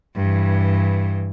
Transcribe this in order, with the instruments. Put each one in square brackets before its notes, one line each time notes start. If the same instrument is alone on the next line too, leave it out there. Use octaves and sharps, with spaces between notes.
[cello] G2 E3